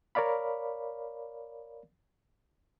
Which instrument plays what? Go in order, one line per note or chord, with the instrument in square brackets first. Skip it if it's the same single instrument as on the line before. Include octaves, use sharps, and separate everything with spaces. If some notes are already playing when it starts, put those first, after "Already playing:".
[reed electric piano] A#4 C#5 D5 F5 B5